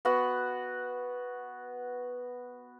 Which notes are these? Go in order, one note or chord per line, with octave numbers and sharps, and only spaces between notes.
B3 F#4 F#5